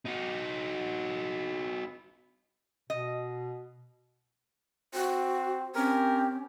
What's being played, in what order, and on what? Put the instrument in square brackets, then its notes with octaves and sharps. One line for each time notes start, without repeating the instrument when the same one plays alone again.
[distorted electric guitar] D#4 F#4
[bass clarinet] B2 [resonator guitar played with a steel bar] D#5
[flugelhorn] C4 [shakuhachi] F#4
[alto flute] C4 [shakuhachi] C#4 [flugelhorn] G4 [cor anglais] A#4